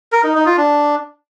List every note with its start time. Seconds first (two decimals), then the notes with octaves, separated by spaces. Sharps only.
0.12 A#4
0.24 D#4
0.35 D#4
0.46 F4
0.57 D4